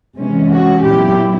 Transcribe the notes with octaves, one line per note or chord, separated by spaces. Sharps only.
C3 E3 G#3 C#4
F#4
A#2 F#3 B3 E4 G4